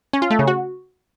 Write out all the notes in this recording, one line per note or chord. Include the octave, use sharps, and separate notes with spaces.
C#4
F4
A3
C#3
F#4